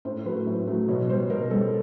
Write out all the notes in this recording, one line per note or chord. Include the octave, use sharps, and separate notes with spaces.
A2 C5
F#3 A3 B4
A2
F#3 A3
B2 C#5
G3 C5
B2 A#4
G3 A4